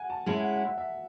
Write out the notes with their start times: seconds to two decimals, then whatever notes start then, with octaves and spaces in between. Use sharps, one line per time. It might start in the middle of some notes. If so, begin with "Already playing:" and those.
Already playing: F#5 G#5
0.10 A5
0.26 G#3 C#4 E4 A5
0.34 E5
0.40 F#5
0.53 F#5
0.66 E5
0.78 E5